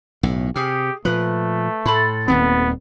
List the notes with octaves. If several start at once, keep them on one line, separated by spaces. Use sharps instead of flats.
B1 A2
C3 G4 G#4 F6
A#2 F3 A3 B4
A2 A4 B5 C6
D#1 D#2 B3 C4